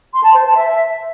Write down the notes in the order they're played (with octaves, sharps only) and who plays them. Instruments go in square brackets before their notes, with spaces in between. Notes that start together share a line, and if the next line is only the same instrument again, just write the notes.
[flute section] C6
A5
C5
A5
E5